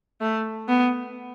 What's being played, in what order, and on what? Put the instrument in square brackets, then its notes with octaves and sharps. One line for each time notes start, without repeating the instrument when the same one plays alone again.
[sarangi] A3
B3